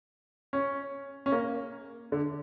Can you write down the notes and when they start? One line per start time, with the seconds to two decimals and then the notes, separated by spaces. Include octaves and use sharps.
0.53 C#4
1.26 C#4
1.32 A#3
2.12 D3